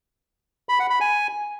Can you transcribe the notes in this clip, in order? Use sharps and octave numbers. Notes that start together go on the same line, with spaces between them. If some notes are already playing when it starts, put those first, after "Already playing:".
B5
F#5
B5
G#5